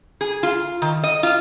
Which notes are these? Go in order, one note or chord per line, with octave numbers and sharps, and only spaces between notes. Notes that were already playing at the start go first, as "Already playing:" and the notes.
G#4
F4
D#3
D#5
F4